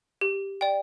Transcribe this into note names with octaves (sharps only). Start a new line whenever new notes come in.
G4
D5 G5